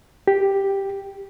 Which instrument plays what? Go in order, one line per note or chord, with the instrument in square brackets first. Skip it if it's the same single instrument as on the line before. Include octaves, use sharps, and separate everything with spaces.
[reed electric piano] G4